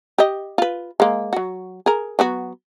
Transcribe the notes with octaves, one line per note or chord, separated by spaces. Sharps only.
G4 D#5
F4 B4
G#3 A#3
F#3 F#4
G#4 A#4
F#3 B3 F#4